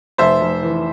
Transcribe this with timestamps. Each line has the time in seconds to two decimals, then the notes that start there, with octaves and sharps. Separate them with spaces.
0.18 F1 C5 E5
0.41 F1
0.63 E3